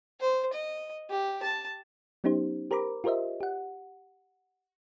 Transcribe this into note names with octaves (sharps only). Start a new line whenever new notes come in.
C5
D#5
G4
A5
F#3 B3 C#4 D#4 G4 C5
G4 A#4 C5 A#5 B5 D6
F4 G4 A#4 C5 D#5 E5
G4 F#5